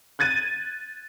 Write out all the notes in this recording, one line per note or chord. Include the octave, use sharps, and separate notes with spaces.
F#6 G#6 A6 D#7